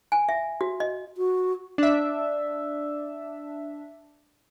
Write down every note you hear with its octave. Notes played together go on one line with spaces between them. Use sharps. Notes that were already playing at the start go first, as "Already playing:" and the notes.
G#5
E5
F#4
D#5
F#4
D4 E5